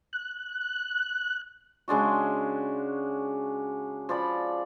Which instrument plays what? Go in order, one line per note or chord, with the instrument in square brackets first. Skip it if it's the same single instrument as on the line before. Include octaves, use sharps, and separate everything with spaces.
[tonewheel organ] F#6
[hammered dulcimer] C#3 G#3 D4 F#4
F3 D5 B5